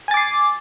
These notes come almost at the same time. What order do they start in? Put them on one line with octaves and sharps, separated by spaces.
G#5 A6 D6 C7